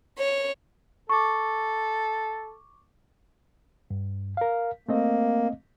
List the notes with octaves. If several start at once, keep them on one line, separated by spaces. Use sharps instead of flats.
C#5
A4 C#6 D6
G2
A#4 F5
A3 A#3 C4 D#5